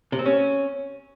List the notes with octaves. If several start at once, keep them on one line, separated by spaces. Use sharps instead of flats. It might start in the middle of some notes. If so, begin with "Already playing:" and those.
C3
C4
C#4